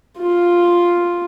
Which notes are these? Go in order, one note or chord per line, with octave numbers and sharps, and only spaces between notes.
F4